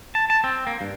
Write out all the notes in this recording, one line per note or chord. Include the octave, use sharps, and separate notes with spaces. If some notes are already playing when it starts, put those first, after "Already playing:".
A5
A5
C4
A#3
G2